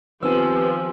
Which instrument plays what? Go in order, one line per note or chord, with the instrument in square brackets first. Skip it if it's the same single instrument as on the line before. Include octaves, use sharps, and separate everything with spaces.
[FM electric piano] D#3 B3 C4 [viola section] F3 G4 [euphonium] B4 [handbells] G#5 E6